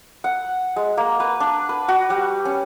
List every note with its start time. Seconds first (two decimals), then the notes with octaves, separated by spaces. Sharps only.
0.24 F#5
0.76 G#3
0.97 A#3
1.20 B4
1.40 D4
1.69 B4
1.88 F#4
2.10 G3
2.45 C#4